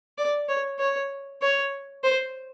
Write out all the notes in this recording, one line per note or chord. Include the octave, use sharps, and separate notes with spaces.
D5
C#5
C#5
C#5
C5